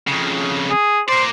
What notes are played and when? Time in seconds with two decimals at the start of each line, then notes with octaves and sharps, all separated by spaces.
0.08 F2 C#3
0.70 G#4
1.09 A#4 C5 D5